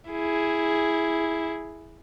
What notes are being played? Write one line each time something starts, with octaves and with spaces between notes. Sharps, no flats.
E4 G#4